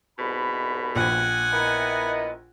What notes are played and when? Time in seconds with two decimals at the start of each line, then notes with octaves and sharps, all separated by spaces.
0.18 C2 G#2 B2 B5
0.96 A#1 F#5 G#5
1.52 B3 E4 A#4 D#5